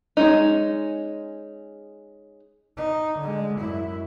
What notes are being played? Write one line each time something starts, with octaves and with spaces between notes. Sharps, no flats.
G#3 C#4 D#4
D#4
D3 G#3
F#2 E4